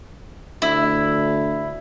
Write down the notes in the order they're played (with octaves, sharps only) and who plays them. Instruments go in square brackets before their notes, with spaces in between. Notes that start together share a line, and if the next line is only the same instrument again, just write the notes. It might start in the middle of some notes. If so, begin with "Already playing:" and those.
[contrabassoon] D2 [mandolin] E4